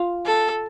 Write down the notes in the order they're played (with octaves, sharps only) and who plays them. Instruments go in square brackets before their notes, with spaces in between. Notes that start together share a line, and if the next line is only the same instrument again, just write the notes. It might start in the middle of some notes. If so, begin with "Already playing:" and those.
Already playing: [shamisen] F4
[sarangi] A4